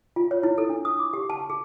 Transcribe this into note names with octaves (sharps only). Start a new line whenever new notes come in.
F4
C#5
E4
A4
D4
D#6
D6
G4
A5
G#4